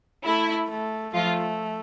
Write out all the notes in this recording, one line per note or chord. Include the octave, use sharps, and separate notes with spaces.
A3 E4
A3
F3 A3 F4